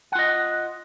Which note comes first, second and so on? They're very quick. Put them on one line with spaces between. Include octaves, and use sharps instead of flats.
F#5 F4 D#5